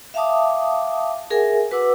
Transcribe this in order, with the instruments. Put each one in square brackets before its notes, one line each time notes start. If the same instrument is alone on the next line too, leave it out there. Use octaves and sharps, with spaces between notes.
[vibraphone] E5 F5 G5 A5 D6 D#6
G#4 A#4 E5 F#5 G#5
F#4 B4 F#5 D6 E6